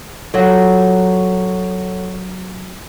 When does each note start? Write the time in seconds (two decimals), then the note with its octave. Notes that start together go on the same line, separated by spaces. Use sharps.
0.34 F#3 F4 F#4 A4 C#5 F#5